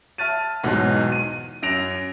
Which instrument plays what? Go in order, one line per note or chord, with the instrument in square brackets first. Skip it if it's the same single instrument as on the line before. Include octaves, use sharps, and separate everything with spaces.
[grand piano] E5 A5 F6 A6 D#7
B1 E2 G#2 B2
D#7
F#2 A#6 D7 F7